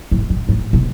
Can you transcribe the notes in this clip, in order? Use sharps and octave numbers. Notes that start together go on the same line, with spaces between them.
A2
A2
A2
B2